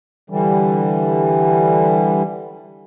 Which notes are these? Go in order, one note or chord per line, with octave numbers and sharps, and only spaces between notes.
D3 E3 G3